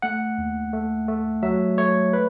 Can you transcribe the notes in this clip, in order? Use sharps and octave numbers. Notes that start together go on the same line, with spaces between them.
A3 F#5
D#2
A3
A3
F#3 E5
A3 C#5
B4